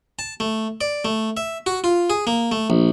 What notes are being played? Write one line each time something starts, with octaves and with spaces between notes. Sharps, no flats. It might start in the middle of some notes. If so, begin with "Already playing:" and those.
A5
A3
D5
A3
E5
F#4
F4
G#4
A#3
A3
A#1